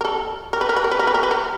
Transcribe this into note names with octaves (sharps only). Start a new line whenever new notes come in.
A#4
A4
A#4
B4
A#4
B4
A#4
B4
A#4
B4
A#4
B4
A#4